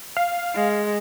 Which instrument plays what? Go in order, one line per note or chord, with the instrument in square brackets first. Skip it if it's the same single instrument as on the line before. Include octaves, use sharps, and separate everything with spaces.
[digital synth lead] F5
[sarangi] G#3